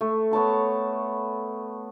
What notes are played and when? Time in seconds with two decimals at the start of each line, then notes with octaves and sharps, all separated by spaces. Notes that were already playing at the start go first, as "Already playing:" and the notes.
0.01 A3
0.31 B3 C#5 A5 C6